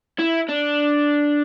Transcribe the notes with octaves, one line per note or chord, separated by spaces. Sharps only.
E4
D4